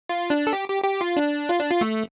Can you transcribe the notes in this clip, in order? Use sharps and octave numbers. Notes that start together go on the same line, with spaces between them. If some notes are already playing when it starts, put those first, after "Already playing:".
F4
D4
A4
G4
G4
G4
F4
D4
F4
D4
F4
A3